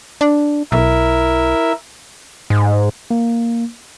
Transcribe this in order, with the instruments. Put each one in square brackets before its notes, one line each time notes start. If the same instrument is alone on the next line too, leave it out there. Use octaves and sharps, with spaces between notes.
[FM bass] D4
[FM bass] B1 [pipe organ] E4 A#4 E5
[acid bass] G#2
[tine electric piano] A#3